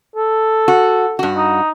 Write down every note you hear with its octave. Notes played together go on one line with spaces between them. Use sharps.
A4
F#4
G2 F#4
D#4